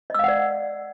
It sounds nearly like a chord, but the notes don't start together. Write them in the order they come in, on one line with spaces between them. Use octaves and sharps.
D#5 E6 F5 F#5 D5